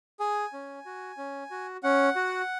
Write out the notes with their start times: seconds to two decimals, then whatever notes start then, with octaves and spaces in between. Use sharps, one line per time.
0.20 G#4 G#5
0.53 C#4
0.86 F#4
1.17 C#4
1.51 F#4
1.83 C#4 F#5
2.16 F#4